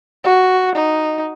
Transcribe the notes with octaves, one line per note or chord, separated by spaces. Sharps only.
F#4
D#4